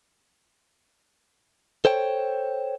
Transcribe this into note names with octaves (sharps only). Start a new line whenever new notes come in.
A4 C5 C#5 G5